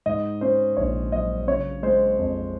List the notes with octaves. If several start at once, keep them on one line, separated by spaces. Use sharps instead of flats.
G#2 D#5
C#4 C5
A#1 C#5
F#3 D#5
C#3 C#5
G#3 C5
F2